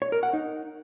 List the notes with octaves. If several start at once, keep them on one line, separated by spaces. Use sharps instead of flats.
C#5
A#4
F#5
D#4